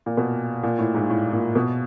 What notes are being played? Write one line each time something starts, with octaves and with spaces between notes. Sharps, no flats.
A#2
B2
A#2
A2
G#2
A2
A#2
B2